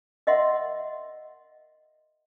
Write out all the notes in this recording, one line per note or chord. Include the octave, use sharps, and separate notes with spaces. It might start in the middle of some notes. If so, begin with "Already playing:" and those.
A#4 D#5 E5 F#5 C6